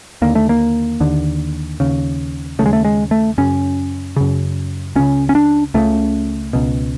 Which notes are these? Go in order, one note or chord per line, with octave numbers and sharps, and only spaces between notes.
D#2 D3 A#3
A3
A#3
D#2 D3
D#2 C#3
D#2 C#3 G#3 A3
A3
G#3
A3
F#2 C#3 C#4
F#2 C#3
C#2 C#3 C#4
C#4
D4
C#2 C#3 A3
C#2 B2